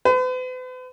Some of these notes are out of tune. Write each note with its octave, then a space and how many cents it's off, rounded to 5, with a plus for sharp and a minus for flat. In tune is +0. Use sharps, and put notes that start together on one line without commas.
B4 +45